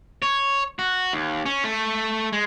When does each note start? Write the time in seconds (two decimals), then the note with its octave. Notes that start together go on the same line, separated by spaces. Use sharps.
0.22 C#5
0.79 F#4
1.13 D#2
1.46 C#4
1.64 A3
2.33 G#3